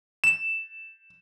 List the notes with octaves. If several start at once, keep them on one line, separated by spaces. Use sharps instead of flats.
E7